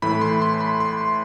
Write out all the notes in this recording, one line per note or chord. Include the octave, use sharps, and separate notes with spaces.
A2 E3 A3 B5
C6
C6
B5
C6